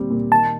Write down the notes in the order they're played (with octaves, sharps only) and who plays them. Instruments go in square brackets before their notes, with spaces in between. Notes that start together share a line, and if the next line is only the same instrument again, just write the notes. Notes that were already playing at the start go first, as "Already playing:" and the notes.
Already playing: [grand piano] A#2 G3 C4
A#2
[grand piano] D#3 [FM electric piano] A5